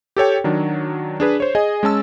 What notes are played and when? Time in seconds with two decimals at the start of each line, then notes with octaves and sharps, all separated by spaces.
0.17 G4 A4 C#5 G5
0.44 D#3 F#3 D4
1.20 D4 G#4 B4
1.40 C5 C#5
1.55 G#4 D#5 G#5
1.83 G#3 C#4 A5 E6